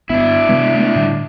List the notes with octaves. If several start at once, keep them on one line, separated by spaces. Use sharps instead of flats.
G1 B3 D4 E4
C3 G#3 B3
A3 B3
A2 D3 G3